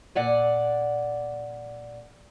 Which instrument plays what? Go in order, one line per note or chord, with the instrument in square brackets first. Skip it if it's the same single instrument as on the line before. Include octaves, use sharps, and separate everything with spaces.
[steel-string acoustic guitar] A#2 D5 F#5 G#5